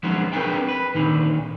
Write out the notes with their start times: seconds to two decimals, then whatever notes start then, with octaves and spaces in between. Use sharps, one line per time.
0.03 F3 F#3 G#3 B3 C#4 D4
0.33 C4 D4 G#4 A#4 B4 G5
0.69 B4
0.95 A#2 D3 D#3